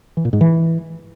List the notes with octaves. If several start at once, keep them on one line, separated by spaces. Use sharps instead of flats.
E3
A#2
G#2
E3